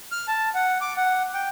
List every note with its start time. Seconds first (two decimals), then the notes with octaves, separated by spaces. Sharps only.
0.12 F6
0.28 A5
0.55 F#5
0.81 D6
0.97 F#5
1.34 G5